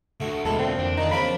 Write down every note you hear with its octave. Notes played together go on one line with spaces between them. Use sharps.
D2 A3 F#4
E2 B2 G#3 E4 A4
A#2 C4
F2 E3 D4
A#2 D#3 D#4
C#3 F3 A#3 C4 B5